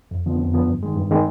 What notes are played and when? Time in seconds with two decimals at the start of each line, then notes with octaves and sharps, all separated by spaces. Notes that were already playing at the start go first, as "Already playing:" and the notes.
0.11 F2
0.26 D3 F3 B3
0.40 F2
0.54 D3 F3 B3
0.67 G2
0.83 D#3 G#3
0.96 G2
1.11 D#3 G#3